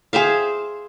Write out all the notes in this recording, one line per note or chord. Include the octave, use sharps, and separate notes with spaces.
G#4 C5 E5 F5